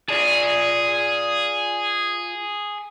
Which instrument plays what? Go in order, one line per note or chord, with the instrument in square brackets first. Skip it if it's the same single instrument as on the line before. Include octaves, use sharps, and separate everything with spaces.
[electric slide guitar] F4 D5 A5 [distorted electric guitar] G#4